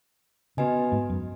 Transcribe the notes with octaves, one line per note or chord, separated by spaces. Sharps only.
C#3 B3 F#4 B4 D#5 G#5
G#2
F#2